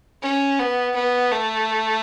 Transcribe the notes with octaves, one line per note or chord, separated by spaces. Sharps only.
C#4
B3
B3
A3